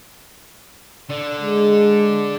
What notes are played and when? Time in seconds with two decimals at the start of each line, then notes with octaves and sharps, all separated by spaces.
1.10 D3
1.41 G#3